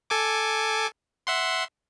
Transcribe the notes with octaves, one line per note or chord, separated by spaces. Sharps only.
A4 G#5 D6
E5 F#5 C6